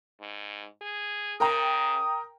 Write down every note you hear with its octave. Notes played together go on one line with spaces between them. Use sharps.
G#2
G#4
C#3 A#4 G5 A#5 D#6